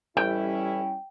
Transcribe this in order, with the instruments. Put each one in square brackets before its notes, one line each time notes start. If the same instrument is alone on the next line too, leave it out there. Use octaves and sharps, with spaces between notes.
[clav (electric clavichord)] A1 [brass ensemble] G3 C#4 E4 [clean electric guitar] G5